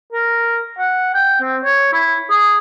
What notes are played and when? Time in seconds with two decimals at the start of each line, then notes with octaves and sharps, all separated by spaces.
0.13 A#4
0.78 F#5
1.15 G5
1.41 C4
1.65 C#5
1.93 E4
2.31 G#4